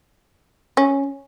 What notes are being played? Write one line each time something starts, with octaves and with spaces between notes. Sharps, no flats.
C#4